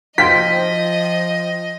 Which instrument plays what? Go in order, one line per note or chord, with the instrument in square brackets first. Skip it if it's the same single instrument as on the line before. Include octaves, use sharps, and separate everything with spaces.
[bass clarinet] F3 [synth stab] F4 C5 G5 [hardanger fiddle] D#5 [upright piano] B6